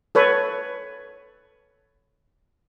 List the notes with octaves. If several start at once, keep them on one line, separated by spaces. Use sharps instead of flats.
A4 B4 C#5